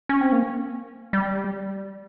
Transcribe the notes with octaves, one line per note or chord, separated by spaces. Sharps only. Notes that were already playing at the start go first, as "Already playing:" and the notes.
C#4
C4
A#3
G3